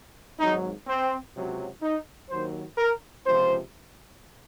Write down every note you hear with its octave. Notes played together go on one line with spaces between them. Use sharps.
G#1 G#2 F#3 D#4
C4
C#2 C3 F#3
D#4
D#2 D#3 F#3 C5
A#4
C#2 C3 F3 C5